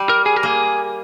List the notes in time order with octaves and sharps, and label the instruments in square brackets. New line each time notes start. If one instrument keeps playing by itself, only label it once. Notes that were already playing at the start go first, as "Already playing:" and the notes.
Already playing: [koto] G3
[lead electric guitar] A#4
G#4
A#4
[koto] A#3 [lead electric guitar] G#4